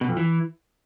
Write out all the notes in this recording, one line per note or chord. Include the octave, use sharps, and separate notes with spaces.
B2
F2
E3